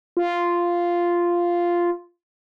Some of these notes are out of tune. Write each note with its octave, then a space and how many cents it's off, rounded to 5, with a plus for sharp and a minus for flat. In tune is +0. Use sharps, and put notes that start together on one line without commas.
F4 -5